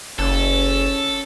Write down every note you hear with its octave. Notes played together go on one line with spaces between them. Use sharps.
F#1 C#4 A4